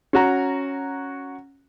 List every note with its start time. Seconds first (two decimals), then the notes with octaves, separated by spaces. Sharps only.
0.13 C#4 F#4 A#5